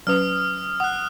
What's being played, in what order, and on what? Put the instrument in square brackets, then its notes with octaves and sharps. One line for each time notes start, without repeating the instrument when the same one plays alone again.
[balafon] F#3 C#4 B4 [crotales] D#6 F6
[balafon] F#5 [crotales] D#6 F#6